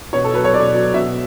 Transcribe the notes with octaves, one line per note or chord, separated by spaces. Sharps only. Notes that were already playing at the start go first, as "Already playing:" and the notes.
B2 C#5
A4
F#3 B4
C#5
B2 D5
F#3
B2 E5